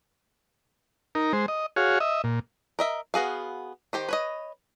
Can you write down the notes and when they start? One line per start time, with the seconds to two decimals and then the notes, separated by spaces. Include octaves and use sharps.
1.15 D#4 A#4
1.33 G#3 C5
1.48 D#5
1.76 F#4 G#4 C#5 F5
2.00 D#5 E5
2.24 A#2
2.79 A#4 D#5 E5
3.14 B3 F#4 G#4 F5
3.93 D#3 G4 C5
4.09 B4 C#5 D#5